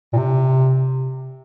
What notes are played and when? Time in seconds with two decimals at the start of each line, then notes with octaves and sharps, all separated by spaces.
0.13 A#2
0.17 C3